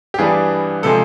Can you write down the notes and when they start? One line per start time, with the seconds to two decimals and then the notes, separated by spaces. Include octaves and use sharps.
0.14 G4
0.18 G2 E3 G3 B3 D4 G#4
0.83 C3 F3 G#3 A4